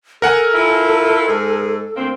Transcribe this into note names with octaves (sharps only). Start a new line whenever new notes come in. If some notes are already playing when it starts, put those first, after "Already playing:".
A4 A#4 F#5 G#5
E4 F4
G#2 G#4
D2 A#3 C4